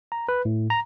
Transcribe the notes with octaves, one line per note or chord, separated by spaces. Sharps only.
A#5
B4
A2
A#5